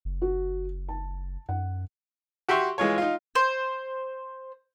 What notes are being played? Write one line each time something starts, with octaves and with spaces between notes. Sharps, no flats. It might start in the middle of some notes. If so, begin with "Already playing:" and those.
F#1
F#4
A5
F#2 F#5
F#4 G4 E5 C6 C#6
E3 G#3 F4 C#5
D#4 F4
C5